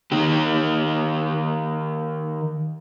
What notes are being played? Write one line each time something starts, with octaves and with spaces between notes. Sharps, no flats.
D#3 G4